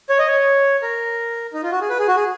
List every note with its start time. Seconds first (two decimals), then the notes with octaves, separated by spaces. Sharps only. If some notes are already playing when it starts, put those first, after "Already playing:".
0.10 C#5
0.19 D#5
0.27 C#5
0.82 A#4
1.53 D#4
1.63 F4
1.72 F#4
1.81 G#4
1.90 B4
1.99 G#4
2.08 F#4
2.16 G#4